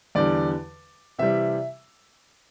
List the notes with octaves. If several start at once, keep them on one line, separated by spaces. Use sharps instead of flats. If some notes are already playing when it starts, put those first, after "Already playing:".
E2 D3 G3 D5
C3 E3 G3 E5